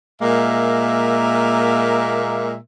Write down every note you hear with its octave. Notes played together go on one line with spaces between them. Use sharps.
A#2 G#3 A#3 A#4 E5